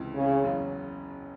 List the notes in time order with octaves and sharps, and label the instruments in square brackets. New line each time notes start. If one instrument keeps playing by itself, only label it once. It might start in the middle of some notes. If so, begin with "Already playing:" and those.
Already playing: [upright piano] C#2 C3 E3
[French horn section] C#3
[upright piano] F#1 E2 C#3 F#3 C#4